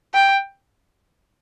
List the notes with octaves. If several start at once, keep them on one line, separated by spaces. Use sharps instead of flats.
G5